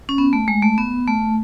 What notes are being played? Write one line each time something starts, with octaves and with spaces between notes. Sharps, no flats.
C#4
B3
A3
G#3
A3
B3
A3